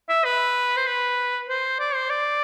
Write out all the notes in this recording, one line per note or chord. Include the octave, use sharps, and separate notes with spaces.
E5
B4
C5
B4
C5
D5
C5
D5